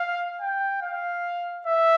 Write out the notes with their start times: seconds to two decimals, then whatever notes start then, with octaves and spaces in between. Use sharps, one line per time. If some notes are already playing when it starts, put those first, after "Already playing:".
Already playing: F5
0.41 G5
0.82 F5
1.66 E5